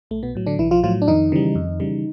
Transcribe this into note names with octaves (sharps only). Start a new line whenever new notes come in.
B1 A3
B2 B3
A2 F#3
D3 D4
B1 E3 E4
F3 F4
A2 F3 F#3 F4
D4
F2 D#3 D#4
C#3 E3 G3
F2
C#3 E3 G3